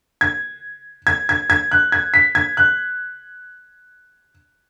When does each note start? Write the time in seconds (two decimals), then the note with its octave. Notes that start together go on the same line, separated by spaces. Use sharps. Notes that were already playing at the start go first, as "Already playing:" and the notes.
0.21 G#6
1.07 G#6
1.29 G#6
1.50 G#6
1.71 F#6
1.92 G#6
2.14 B6
2.35 G#6
2.57 F#6